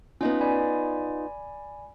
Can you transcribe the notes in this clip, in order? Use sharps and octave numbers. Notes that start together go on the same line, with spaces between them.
B3 C#4 D#4 F4
D5 G#5 B5